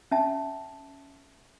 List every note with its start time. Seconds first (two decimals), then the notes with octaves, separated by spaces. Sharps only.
0.11 C#4 E5 A5